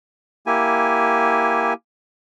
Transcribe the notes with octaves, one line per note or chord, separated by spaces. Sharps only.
A#3 E4 G4 G#5